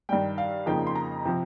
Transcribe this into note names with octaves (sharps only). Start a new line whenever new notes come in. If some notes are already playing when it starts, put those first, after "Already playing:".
G2 D#3 G3 G5
F5
F2 C#3 F3 A#3 D#4 G5
C6
A#5
C3 F3